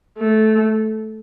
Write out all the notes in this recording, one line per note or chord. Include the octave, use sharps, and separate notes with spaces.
A3